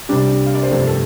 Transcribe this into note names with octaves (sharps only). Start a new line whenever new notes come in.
C2 C3 G3 D4
F5
D5
C5
G1 F2 C3 A3 A4
A4